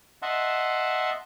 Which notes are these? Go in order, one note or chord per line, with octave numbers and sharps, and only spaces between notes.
D#5 E5 F#5 A5 C6